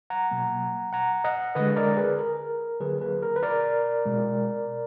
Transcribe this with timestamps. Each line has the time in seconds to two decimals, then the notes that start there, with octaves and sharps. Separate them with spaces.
0.10 F#5 A#5
0.31 B2 F#3 A#3
0.93 F#5 A#5
1.24 D#5 F#5
1.55 D3 G#3 B4 D#5
1.76 A#4 D5
1.97 G#4 B4
2.18 A#4
2.80 D3 F#3 A#3 G#4 B4
3.01 G#4 B4
3.23 A#4
3.36 B4
3.43 A#4 D5
4.06 B2 G#3